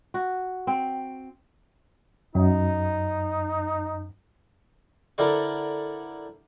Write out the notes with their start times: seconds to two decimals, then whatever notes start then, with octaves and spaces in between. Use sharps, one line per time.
0.14 F#4
0.67 C4
2.35 F#2 D#4
5.18 D3 E4 A4 A#4 C5 D5